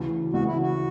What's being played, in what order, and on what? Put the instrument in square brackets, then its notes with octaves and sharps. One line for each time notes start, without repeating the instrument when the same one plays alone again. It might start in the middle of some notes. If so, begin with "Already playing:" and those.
Already playing: [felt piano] D2 C#3 E3
[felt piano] D2 C#3 E3 [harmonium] F#4
[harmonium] E4
F#4